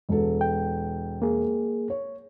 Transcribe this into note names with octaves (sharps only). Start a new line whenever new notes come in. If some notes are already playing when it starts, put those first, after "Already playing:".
E1 A4
G5
A#3 G#4
C#5